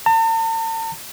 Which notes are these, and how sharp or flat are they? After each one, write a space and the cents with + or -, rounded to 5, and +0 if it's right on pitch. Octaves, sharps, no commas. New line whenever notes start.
A5 +45